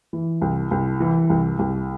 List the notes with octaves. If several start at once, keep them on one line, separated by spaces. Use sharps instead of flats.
E3
C2
C2
E3
C2
C2